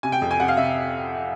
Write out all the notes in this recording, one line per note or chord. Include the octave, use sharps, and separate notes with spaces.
C3 G#5
G5
F2
G#5
C3 F#5
F5
C3 E5